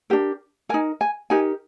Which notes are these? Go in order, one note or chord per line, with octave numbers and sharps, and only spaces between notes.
D4 G4 A#4
D#4 A#4 G#5
G#5
D#4 G4 A#4 G#5